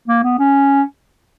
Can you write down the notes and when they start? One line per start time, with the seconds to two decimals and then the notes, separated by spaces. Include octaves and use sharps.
0.08 A#3
0.23 B3
0.39 C#4